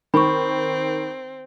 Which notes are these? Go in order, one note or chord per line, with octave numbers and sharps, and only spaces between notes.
D#3 C4 B5 C#6